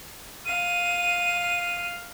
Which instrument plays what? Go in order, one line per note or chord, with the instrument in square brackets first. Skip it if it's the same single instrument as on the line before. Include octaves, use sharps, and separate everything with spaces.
[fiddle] F5 [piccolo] D#7